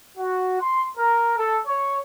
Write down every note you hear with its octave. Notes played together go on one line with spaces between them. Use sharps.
F#4
C6
A#4
A4
C#5